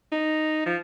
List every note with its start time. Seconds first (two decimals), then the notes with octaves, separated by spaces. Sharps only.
0.12 D#4
0.66 F3